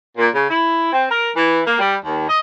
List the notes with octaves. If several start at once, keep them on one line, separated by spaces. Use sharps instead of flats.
A#2
C#3
E4
C4
A#4
E3
A#3
G3
D#2
D#5